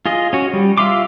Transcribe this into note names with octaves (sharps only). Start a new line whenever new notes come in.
F4 G#4 D#5
C#4 F#4
G3
F4 E5 F5 C6 D6